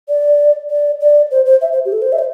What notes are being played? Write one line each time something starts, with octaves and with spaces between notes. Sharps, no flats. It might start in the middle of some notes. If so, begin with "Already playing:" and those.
D5
D5
D5
C5
C5
E5
C5
G4
A4
C5
E5
C5